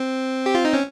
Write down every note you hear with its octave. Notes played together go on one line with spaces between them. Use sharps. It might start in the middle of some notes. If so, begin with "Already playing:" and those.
Already playing: C4
G4
F4
D#4
C#4